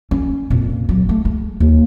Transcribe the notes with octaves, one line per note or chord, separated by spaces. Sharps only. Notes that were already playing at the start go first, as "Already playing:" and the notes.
C#4
F2 A#2
F#3
A3
G#3
D#2